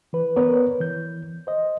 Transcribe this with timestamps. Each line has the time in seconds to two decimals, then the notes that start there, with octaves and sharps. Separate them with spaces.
0.13 E3 B4
0.36 B3 A#4 B4 C#5 D5
0.80 E3 G6
1.47 C5 D#5